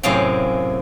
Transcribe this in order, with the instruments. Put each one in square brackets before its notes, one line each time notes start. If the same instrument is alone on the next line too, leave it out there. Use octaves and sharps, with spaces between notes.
[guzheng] F#2 A2 C3 G#4 F5 G5